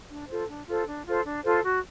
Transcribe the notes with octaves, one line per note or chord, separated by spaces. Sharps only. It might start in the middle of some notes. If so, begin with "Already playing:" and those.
D4
F4 A4 C5
D4
F4 A4 C5
D4
F4 A4 C5
D4
F4 A4 C5
F#4